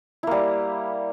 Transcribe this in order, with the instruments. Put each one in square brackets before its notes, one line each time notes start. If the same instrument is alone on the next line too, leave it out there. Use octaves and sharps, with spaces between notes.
[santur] E4
A#3
G3